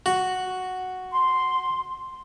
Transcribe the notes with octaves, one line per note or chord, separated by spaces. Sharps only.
F#4
C6